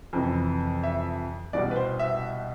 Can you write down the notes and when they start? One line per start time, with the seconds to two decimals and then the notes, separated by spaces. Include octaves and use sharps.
0.13 F2 C3 E3
0.84 E5
1.53 C2 B2 G3 D5
1.71 B4
1.76 C5
1.99 E5